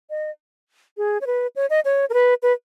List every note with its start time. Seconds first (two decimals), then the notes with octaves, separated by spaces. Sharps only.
0.10 D#5
0.98 G#4
1.21 C#5
1.27 B4
1.56 C#5
1.70 D#5
1.85 C#5
2.10 A#4
2.14 B4
2.43 B4